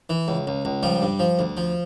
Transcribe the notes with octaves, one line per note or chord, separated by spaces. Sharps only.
E3
C#2
C#2
C#2
F3 G3
G2
F3
D2
F3